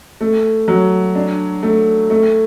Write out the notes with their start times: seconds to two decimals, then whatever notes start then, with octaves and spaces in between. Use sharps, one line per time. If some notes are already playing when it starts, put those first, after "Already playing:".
0.21 A3
0.68 F#3
1.15 D4
1.63 A3
2.10 A3